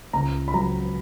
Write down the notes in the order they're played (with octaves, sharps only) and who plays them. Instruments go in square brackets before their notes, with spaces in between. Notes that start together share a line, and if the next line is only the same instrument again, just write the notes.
[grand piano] C#2 A#5
B5
F#3 A#5